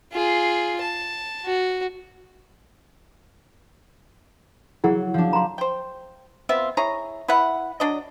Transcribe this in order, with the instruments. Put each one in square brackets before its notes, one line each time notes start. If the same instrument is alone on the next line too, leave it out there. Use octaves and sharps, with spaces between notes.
[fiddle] F4 G#4
A5
F#4
[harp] F#3 [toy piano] E4 G#4 F#5
[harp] F3 D4
[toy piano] A#5 C6
[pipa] C5 G5
B3 C4 F4 E5
E4 G#4 C#5 A#5
E4 B4 E5 F#5
F#3 D4 D5 D#5